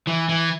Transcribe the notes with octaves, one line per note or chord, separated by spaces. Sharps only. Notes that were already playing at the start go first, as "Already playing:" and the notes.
E3
E3